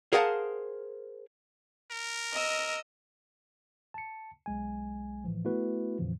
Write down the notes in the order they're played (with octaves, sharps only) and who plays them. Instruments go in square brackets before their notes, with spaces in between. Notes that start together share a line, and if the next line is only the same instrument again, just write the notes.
[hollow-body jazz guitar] G#4 A#4 C5 F5 F#5 A5
[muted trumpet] A#4
[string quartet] D#5 E6
[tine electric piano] A5 C#7
B1 G#3 G#5
A2 E3 F3
A3 B3 E4 F#4 B4
F2 A#2 D3 E3 F3